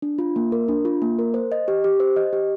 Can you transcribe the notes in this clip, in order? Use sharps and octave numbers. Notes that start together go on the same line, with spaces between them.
D4
F4
A#3
A#4
D4
F4
A#3
A#4
C5
D#5
G4
G4
C5
D#5
G4